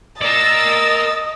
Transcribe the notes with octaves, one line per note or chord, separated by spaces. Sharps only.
A#4 D5 D#5 E6 A6